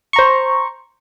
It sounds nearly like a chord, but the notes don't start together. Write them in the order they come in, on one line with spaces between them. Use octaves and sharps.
C#6 A#5 C5